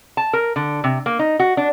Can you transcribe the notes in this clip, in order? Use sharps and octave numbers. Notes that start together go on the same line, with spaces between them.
A5
A#4
D3
C3
A#3
D#4
F#4
D4